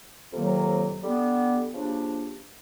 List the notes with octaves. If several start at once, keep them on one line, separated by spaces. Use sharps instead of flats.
F2 C3 D#3 F#3 A#3
D3 G3 B3
C#3 F3 A#3 D4 G4